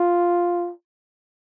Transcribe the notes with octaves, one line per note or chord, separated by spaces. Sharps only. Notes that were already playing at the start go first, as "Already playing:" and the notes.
Already playing: F4